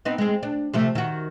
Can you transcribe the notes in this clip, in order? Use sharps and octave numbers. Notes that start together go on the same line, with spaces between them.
B3 C4 D#4
G#3 C4
D4
C3 F3 A3
D#3 F#4